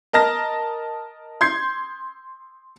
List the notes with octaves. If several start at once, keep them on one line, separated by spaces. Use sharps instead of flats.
A#4 D#5 A5 F6 A#6
C6 G6 G#6 C7